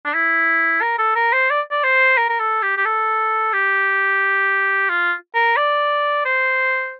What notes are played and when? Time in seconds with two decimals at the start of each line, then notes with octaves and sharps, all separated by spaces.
0.05 D4
0.14 E4
0.82 A#4
0.98 A4
1.15 A#4
1.33 C5
1.50 D5
1.71 D5
1.84 C5
2.17 A#4
2.30 A#4
2.40 A4
2.62 G4
2.77 G4
2.85 A4
3.53 G4
4.89 F4
5.35 A#4
5.57 D5
6.25 C5